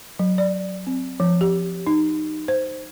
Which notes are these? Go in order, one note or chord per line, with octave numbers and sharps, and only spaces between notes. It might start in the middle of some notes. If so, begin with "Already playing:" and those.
F#3
D5
C4
F3
G4
D#4
C5